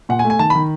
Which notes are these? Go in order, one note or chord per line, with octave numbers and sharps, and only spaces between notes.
A#2 F#5
G#5
A3
G#5
D#3 A5
D#3 B5